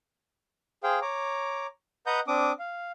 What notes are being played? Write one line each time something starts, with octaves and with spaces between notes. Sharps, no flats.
G#4 C5 F5 G5
C#5 A#5 D6
B4 D#5 F#5 A#5 D#6 G6
C4 D4 D6 D#6
F5